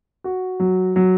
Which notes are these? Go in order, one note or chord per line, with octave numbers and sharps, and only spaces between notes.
F#4
F#3
F#3